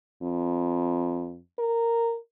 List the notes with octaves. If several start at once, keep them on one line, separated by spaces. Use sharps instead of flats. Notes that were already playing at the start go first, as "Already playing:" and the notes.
F2
A#4